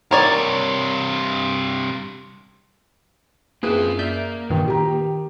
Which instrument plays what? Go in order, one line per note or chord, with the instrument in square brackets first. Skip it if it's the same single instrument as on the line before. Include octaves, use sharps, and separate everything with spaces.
[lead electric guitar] G2 C3 [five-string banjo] A#4 C#5 D5
[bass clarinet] F#2 [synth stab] A#3 E4 B4 [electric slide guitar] C4 F4 C5 [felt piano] G#4
[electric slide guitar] A#3 [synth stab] D5 E5 G6
[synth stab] G2 A#2 E3 [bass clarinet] D#3
[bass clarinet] D#3 [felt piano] G4 A#5